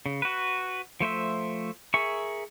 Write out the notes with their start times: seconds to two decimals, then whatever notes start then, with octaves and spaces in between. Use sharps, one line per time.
0.06 C#3
0.22 F#4 B4
1.00 F3 A3 C5 E5
1.94 G#4 A#4 E5 C#6